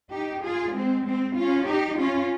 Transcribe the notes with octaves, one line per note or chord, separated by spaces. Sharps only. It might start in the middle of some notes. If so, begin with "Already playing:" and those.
D#4 G4
F4 G#4
G#3 C4
G#3 C4
C#4 F4
D#4 G4
C#4 F4